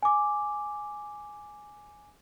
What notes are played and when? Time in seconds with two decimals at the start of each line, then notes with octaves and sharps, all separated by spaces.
0.03 G#5 D6